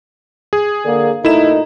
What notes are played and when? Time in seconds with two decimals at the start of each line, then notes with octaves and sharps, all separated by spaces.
0.53 G#4
0.85 D3 A#3
1.25 A#2 A3 D#4 E4 E7